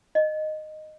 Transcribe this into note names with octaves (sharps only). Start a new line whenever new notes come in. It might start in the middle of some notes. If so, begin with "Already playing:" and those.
D#5